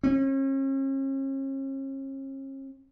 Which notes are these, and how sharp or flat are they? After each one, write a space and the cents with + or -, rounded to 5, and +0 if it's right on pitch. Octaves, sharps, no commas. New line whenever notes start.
C#4 -40